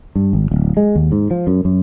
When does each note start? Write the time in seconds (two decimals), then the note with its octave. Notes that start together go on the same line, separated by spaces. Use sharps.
0.16 G2
0.33 G#1
0.51 D1
0.77 G#3
0.95 D#2
1.12 G#2
1.31 F3
1.47 F#2
1.65 F#2